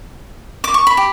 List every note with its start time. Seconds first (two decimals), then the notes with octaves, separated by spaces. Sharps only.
0.64 D6
0.74 C#6
0.87 B5
0.97 G4